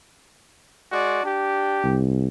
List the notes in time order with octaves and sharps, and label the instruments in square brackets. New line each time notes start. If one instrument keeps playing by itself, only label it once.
[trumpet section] G#3 F#4 D5
D4 G4
[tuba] C2